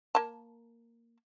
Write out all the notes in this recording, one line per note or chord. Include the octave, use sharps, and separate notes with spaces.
A#3 A5